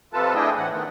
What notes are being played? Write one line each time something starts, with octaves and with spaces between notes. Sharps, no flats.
F2 C3 F4 A4 B4 A5
A3 D4 E4 G#4 D#5 G5
A2 E3 F#5
D#3 A3 B3